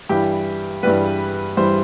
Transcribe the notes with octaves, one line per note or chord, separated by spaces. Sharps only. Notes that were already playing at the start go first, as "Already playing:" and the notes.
G2 E3 G3 G4
G2 E3 G3 B4
G2 E3 G3 C5